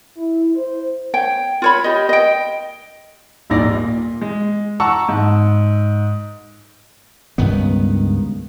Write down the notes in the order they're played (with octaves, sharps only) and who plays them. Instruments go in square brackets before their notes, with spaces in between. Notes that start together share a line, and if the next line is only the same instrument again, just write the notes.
[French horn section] E4
C5
[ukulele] C#5 G5
F4 C#5 B5
G4 D#5
D#5 G5
[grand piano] D#1 A#1 D#2 D#4 D5 A#6
A#2
G#3
F#5 A5 A#5 C#6 E6
G#2
[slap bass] C#2 G2 D#3 B3